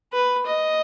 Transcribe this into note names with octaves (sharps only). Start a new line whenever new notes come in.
B4
D#5